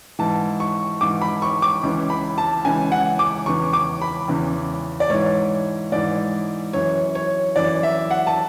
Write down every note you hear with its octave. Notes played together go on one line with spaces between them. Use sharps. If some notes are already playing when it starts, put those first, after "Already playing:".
G#2 E3 A5
C#6
G#2 E3 D6
B5
C#6
D6
C#2 C#3 E3
B5
A5
C#2 C#3 E3 G#5
F#5
D6
E2 C#3 E3 C#6
D6
B5
E2 C#3 E3
D5
G#2 E3 C#5
G#2 E3 D5
F#2 E3 C#5
C#5
F#2 E3 D5
E5
F#5
A5